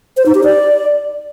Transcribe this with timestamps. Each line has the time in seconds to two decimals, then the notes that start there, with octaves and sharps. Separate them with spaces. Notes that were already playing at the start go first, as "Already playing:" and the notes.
0.17 C5
0.26 D#4
0.35 G4
0.44 D5